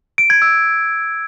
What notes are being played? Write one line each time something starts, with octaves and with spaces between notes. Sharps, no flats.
D7
G#6
E6